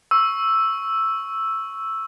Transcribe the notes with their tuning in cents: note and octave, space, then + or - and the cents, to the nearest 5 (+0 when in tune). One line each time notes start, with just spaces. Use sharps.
C#6 +0 E6 +0